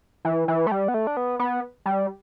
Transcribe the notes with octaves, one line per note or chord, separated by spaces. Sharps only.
E3
E3
A3
G3
B3
A3
D4
B3
B3
G3